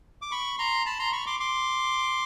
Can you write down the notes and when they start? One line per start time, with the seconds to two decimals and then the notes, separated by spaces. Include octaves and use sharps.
0.22 D6
0.31 B5 C#6
0.58 A#5 C6
0.86 A5 B5
0.99 A#5 C6
1.13 B5 C#6
1.27 C6 D6
1.40 C6 D6